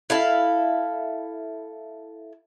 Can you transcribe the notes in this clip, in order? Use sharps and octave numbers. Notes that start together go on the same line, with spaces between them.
E4 A4 F5